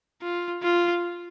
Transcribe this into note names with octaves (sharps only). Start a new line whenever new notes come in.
F4
F4